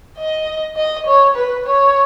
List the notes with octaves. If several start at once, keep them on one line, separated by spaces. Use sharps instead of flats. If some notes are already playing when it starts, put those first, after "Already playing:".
D#5
D#5
C#5
B4
C#5